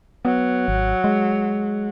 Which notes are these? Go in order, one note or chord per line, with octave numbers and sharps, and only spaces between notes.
F#3 B3
G#1
G#3